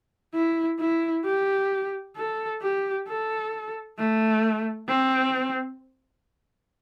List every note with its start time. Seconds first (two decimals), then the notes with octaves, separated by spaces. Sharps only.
0.34 E4
0.80 E4
1.25 G4
2.16 A4
2.62 G4
3.07 A4
3.98 A3
4.89 C4